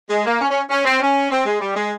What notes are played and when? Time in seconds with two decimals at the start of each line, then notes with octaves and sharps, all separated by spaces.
0.10 G#3
0.25 A#3
0.40 C#4
0.50 C#4
0.70 C#4
0.85 C4
1.00 C#4
1.31 C4
1.46 G#3
1.60 G3
1.75 G#3